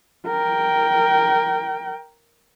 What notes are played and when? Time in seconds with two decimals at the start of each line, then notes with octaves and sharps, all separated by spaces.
0.27 A#4 G5